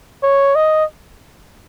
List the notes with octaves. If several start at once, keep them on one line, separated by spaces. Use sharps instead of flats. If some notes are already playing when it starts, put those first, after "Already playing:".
C#5
D#5